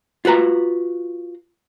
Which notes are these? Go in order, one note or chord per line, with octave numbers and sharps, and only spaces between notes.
F4 F#4 B4 A#5